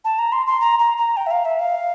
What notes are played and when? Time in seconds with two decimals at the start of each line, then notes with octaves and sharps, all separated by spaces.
0.05 A5
0.19 A#5
0.32 C6
0.47 C6
0.61 A#5
0.79 A#5
0.98 A#5
1.17 G5
1.27 E5
1.31 F5
1.45 E5
1.59 F5